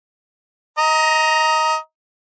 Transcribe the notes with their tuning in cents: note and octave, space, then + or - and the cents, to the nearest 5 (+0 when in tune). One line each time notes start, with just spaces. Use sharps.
D#5 +20 A#5 +0